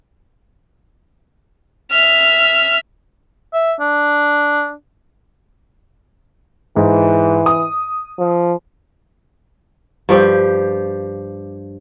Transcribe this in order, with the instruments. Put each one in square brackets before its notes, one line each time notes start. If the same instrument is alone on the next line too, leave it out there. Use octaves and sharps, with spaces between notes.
[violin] E5 F6
[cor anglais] E5
D4
[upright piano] G#2 [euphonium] E3
[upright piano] D#6
[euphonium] F3
[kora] G2 F3 G4